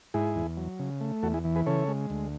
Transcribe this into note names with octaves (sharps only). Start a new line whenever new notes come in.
G#2 E4 G#4
E2
F#3
C#3
A3
E2 F#4 A4
E4 G#4
E3
G#4 B4
C#3 A4 C#5
G#3
D2